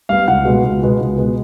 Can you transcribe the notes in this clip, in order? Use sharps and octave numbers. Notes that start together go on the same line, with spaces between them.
G3 B3 F5
C#2 F#5
B2 G#3 B3
C#2
B2 G#3 B3
C#2
B2 G#3 B3